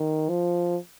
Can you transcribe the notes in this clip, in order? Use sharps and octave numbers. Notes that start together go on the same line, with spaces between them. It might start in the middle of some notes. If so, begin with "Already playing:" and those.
Already playing: D#3
F3